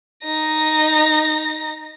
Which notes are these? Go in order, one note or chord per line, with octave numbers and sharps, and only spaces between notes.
D#4 A#6